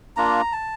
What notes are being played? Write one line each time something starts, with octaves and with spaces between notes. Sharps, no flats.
A#3 D4 F4 A#5
A5